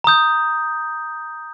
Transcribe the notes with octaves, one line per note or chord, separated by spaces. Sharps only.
A#5 D#6 G6